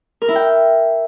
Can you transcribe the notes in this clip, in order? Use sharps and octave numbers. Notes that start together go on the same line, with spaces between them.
A#4
E4
G5